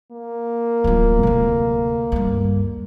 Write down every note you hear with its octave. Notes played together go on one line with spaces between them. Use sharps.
A#3
D1 F4
D2 C3
D2 G2